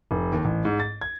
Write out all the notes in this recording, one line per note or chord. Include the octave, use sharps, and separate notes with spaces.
F1
D#2
A1
G#2
A6
G#6